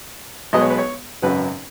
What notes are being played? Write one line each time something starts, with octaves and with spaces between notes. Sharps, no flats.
B1 B2 G#3 B3 D#5
C#5
B4
C#5
G#1 F#2 C#3 F#3 B4